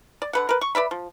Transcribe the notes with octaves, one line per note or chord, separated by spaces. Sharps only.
D5
D3 B4 F#5
A#4 B4
C#6
B4 D5 E5 B5
F3